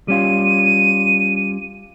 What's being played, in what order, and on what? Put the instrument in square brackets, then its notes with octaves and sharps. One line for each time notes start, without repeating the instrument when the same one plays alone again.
[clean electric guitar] G3 C#4 F4 [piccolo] D#7